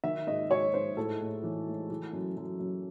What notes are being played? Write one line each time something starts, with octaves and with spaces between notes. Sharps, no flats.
D#3 E5
G#2 D#5
G#2 C#5
G#2 C5
A2 A4
A2
E3
A3
E3
F#2
F#2
F#2